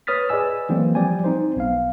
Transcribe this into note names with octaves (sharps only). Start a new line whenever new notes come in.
B4 C#5 D#6 F6 A6 B6
G#4 B4 D5 D#5 G#5 E6
E3 F#3 A#3 C4
F3 G3 D5 G5 G#5
C4 D#4 C5
B1 B3 F5